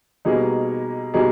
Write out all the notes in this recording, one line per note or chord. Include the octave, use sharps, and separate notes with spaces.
B2 G3 A#3 D#4 G#4
B2 G3 A#3 D#4 G#4